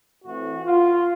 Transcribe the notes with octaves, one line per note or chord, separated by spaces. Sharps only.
A2 E3 A3 C4 F#4
F4